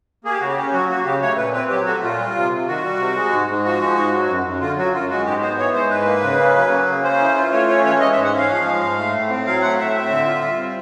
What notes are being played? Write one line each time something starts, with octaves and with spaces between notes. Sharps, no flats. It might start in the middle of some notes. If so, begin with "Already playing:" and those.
A#3 G#4
G4
C#3 F#4
G4
C#4
F#3 F#4
A#3 F#4
C#3 G4
A3 C#5
A#2 B4
C4 B4
F#3 G4
A3 F#4
A#2 F4
G3
C3
C3
D#3 F#4
G3
C3
G#3
G#2
G#2
F3 F#4
G#3
G#2
F#3
F#2
F#2
D3 F4
F#3 F#4
F#2 F4
G#3 F#4
G#2 G4
B3 C5
E3 C#5
G#3 C5
G#2 B4
A#3
C#3
C#4
F#3
A#3
C#3
C#4 C5
E3
F4
A3 C#5
C#4 C#5
E3 C#5
G#3 D#5
E5
G#2
F#5
C#4 F5
F3
G#3
G#2
A3
A2
C4
F#3 F5
A3 F#5
A2 E5
C4
D3
F4
G3
C4